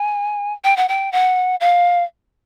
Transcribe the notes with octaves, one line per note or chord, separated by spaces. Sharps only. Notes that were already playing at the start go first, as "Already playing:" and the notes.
Already playing: G#5
G5
F#5
G5
F#5
F5